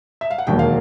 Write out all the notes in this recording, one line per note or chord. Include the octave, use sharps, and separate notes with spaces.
E5
F5
F#5
E1 D#2 D3 F#3 A#3 G5
F5